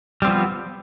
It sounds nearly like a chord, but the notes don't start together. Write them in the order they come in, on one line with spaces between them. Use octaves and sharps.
G3 C4 F3 B3